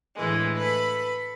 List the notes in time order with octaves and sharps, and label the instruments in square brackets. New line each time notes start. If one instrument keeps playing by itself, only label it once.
[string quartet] D2 A2 E3 G#3
A4 B4 B5